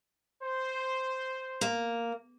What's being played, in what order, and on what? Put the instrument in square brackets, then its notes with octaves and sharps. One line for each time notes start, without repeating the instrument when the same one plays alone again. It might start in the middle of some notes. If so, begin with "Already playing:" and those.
[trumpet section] C5
[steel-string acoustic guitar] A#3